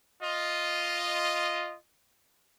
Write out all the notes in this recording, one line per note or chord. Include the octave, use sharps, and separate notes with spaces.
F4 D#5